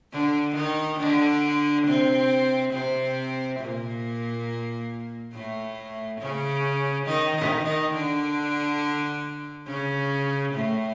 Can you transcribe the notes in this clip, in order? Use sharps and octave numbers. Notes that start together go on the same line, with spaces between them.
D3 D4
D#3 D#4
D3 D4
C3 C4
C3 C4
A#2 A#3
A2 A3
C#3 C#4
D#3 D#4
D#3 D#4
D#3 D#4
D3 D4
C#3 C#4
A2 A3